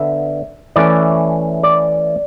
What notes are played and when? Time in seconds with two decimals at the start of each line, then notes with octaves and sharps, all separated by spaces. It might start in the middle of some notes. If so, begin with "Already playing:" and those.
Already playing: D3 B3 E5
0.76 E3 A3 C#4 D5
1.63 D5